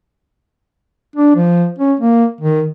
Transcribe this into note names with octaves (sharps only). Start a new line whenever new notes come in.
D4
F3
C#4
A#3
D#3